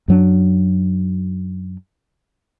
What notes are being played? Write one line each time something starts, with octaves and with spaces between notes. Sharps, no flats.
F#2 F#3 D4